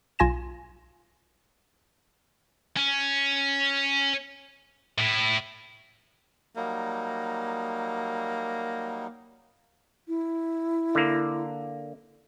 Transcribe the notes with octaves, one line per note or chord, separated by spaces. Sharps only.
B1 F4 G#5 A#6 E7
C#4
A2 E4
F#3 G3 A#3 D#4
E4
D3 A#3